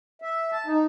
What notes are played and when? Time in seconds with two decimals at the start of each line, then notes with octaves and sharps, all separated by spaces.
0.22 E5
0.52 A5
0.66 D#4